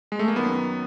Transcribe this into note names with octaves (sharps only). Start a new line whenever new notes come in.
G#3
A3
A#3
F#2 D#3 F#3 B3